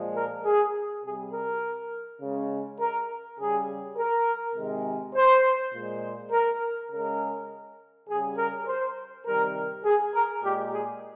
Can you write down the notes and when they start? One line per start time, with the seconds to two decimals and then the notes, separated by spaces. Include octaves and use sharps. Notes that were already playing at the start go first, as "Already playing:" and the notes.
Already playing: A#2 F3 G#3
0.15 A#4
0.44 G#4
1.03 C3 G3 G#4
1.33 A#4
2.20 C#3 G#3
2.79 A#4
3.38 C#3 G3 G#4
3.97 A#4
4.55 C3 D#3 G#3
5.15 C5
5.73 A#2 G#3
6.31 A#4
6.90 C#3 G#3 A#4
8.07 C#3 G3 G#4
8.37 A#4
8.67 C5
9.25 C3 D#3 G3 A#4
9.84 G#4
10.13 A#4
10.43 A#2 G#3 G4
10.72 G#4